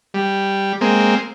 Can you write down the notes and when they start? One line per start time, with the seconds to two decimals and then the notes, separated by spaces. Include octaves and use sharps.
0.14 G3
0.81 G#3 A#3 C4